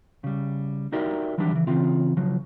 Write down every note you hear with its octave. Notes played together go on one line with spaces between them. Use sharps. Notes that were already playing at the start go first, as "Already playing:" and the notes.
C#3 G3
D#4 E4 F#4 G4 A#4 D5
D#3 E3 F#3 G3 D4 G4
C#3 E3
C#3 E3 C4 F4
C#3 F3 F#3